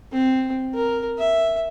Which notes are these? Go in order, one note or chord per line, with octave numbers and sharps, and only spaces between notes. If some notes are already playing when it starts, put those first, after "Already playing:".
C4
A#4
E5